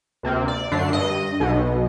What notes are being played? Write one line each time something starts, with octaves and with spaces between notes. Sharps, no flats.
D2 C3 A#3 C4
D5
F#2 D3 A3 D4 C7
G2 D#5
B1 B2